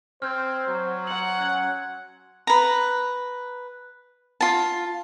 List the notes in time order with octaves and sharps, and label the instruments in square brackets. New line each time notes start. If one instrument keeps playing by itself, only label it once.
[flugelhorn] C4 [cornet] C5 [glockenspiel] F6 G6 G#6
[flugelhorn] F#3
[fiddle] F#5 [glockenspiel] C6 F#7
[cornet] C#4 [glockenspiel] F#6 G#6
[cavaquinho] B4 A#5
F4 A5